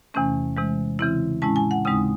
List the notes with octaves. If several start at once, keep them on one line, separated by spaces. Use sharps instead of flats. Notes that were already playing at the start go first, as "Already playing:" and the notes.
E2 C3 E3 A3 C#4
C3 E3 G#3
C#3 E3 C4 E4
A2 G#3 C#4 E4 A5
G#5
F#5
D#2 C#3 G#3 C4 D#4 D#6